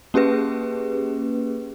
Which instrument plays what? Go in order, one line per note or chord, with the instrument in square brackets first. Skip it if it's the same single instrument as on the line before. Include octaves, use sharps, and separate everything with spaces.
[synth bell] A#3 C#4 G4 G#4 B4